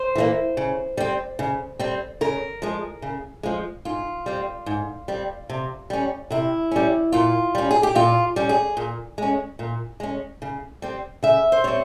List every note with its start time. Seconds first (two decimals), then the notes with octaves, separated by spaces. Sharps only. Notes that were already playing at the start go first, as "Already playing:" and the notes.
Already playing: C5
0.16 E3 G3 A#3
0.57 C#3
0.97 G3 C4
1.39 C#3
1.79 G3 C4
2.21 C#3 A#4
2.62 F3 G#3
3.02 C#3
3.43 F3 G#3
3.85 G#2 F4
4.26 G3 C4
4.66 G#2
5.08 G3 C4
5.50 C3
5.90 G3 C#4
6.30 C3 E4
6.71 G3 C#4
7.12 A#2 F4
7.55 G3 C#4
7.71 G#4
7.83 G4
7.95 A#2 F4
8.36 G3 C#4
8.49 G#4
8.77 A#2
9.18 G#3 C#4
9.59 A#2
10.00 G#3 C#4
10.42 C#3
10.82 G3 C4
11.23 C#3 E5
11.52 C5
11.64 G3 C4 C#5